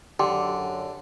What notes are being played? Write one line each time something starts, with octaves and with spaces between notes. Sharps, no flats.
F#2 D3 F#3 D4 G4 G5 C6 D6